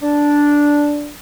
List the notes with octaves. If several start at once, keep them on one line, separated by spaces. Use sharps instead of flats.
D4